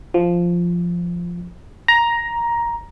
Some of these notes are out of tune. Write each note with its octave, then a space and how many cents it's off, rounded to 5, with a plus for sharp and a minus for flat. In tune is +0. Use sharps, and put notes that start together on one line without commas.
F3 -5
A#5 +10